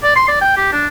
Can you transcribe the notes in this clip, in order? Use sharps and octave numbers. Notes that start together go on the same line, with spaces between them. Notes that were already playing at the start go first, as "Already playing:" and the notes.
D5
C6
D5
G5
G4
D4